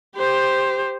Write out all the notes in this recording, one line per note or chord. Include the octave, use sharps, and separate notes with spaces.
G4 C5